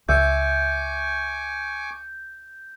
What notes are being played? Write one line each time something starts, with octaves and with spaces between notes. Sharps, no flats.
C#2 E5 G#5 C#6 D6 G6